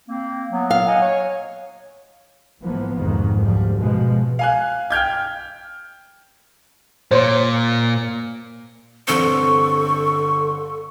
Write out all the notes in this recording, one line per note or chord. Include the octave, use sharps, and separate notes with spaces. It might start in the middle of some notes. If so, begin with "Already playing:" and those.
A#3 C4
F#3 B3
F5
D#5 F#5 G#5
C#5
G#1 G#2 E3 F3 A#3 B3
C2 F2 G#2 D#3
D2 F3 G3
B2 F3 G#3
F5 G#5 F#6
G5 F6 G6 G#6
A#2 C5 C#5 C6
G1 D3 C4 A4 C#6